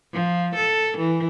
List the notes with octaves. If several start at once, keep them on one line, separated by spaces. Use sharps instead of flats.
F3
A4
E3